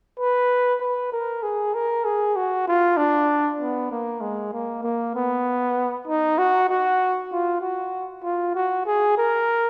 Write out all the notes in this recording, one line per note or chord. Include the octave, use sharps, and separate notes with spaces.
B4
B4
A#4
G#4
A#4
G#4
F#4
F4
D4
B3
A#3
G#3
A#3
A#3
B3
D#4
F#4
F#4
F4
F#4
F4
F#4
G#4
A#4